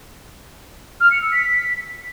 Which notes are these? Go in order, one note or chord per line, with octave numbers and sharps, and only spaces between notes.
F6
C#7
E6
B6